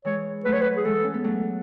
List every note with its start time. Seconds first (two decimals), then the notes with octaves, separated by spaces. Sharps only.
0.05 E3 G#3 C#5
0.45 F#3 A3 B4
0.53 C#5
0.62 B4
0.77 G#4
0.85 E3 G#3 A4
1.04 C#4
1.14 B3
1.24 F#3 A3